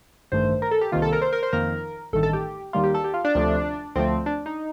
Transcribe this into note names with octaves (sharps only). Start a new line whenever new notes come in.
A1 G2 D#3 A3 C5
A#4
A4
G4
C2 C3 D#3 A#3 F4
A4
A#4
C5
A#4
C5
F2 D#3 A#3 A#4
A1 G2 D#3 A3 A4
A4
G4
D#2 D#3 G3 A#3 F4
G4
A4
G4
F4
D4
D2 C3 F3 A3
D2 D3 F3 A3 C4
D4
D#4